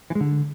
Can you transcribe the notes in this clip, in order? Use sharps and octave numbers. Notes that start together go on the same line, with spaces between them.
E3
G#3
D3